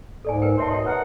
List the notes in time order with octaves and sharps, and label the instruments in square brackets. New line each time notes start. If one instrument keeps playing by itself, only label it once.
[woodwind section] C#2 G#2 [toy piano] A4 D5 G#5
[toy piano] A#4 B4 G5
[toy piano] C#5 E5 A5 [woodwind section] C6
[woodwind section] B2 D#5 [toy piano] C#5 G5
[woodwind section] A#4 F#5 [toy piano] B4 E5